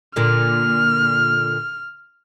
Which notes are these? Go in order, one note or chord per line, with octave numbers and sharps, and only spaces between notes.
A#2 D3 F6